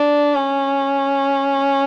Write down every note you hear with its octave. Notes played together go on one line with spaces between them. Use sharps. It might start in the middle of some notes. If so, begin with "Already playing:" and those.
Already playing: D4
C#4